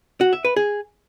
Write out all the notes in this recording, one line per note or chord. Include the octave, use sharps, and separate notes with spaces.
F#4
E5
B4
G#4